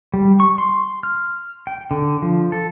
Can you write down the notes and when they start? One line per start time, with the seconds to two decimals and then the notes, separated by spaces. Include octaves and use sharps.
0.14 G3
0.40 C#6
0.58 C6
1.03 F6
1.67 G5
1.91 D3
2.22 F3
2.52 A4